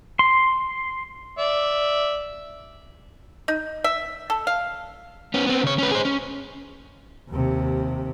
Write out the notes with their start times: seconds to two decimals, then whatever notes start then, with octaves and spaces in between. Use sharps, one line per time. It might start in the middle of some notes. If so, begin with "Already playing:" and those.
0.19 C6
1.38 D5 E5
3.48 D#4
3.84 E5
4.30 A4
4.47 F5
5.34 B3 C#4
5.47 B3 C4
5.63 C#3 C#5
5.78 C#4 B4
5.91 G#4 C5
6.05 C#4
7.29 D#2 C3